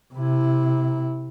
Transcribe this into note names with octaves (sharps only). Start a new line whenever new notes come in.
C3 E4